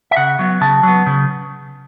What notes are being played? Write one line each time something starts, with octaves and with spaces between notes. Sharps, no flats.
E5
C#3 F#5
F#3 B3
C#3 A5
F#3 B3
C#3